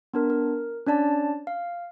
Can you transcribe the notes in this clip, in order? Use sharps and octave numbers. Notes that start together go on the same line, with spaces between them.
B3 D4 A#4
A#4
C#4 D4 D5 A5
F5